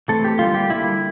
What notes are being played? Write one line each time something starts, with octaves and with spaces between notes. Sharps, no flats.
E3 A3 C4 A4
G4
D3 G3 A#3 F4
G4
D3 G3 A#3 E4